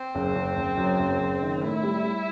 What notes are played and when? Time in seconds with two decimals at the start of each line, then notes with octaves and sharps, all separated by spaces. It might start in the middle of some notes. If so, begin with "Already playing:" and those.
Already playing: C4
0.15 F#1
0.35 F#1
0.57 F#1
0.77 F#2
0.99 F#1
1.20 F#1
1.42 D#3
1.62 A2 E4
1.83 G3
2.04 G3